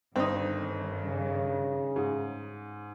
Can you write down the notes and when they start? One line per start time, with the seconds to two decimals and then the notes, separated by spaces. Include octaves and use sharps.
0.16 G1 G2 D#3 C4 D#4
1.03 C#3
1.96 G#2